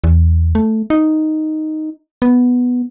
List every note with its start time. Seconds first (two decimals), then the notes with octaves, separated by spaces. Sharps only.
0.04 E2
0.55 A3
0.90 D#4
2.22 B3